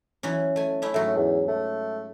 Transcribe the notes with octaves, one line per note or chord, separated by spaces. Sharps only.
E3 F#3 C#4
A3 G#5
A3 C#4 E4
G#2 F#3 A3
E2
A3